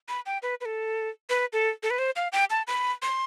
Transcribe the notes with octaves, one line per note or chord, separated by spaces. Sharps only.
B5
G5
B4
B4
A4
B4
A4
A4
B4
C5
F5
G5
A5
B5
C6